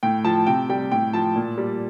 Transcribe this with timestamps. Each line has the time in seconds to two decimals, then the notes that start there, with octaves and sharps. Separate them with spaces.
0.03 A2 G5
0.25 F3 A5
0.47 C3 G5
0.70 G3 G5
0.91 A2 G5
1.13 F3 A5
1.36 A#2
1.58 G3